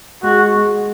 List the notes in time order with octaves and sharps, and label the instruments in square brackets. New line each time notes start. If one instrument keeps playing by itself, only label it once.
[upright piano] G#3 [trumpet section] F#4
[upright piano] G#3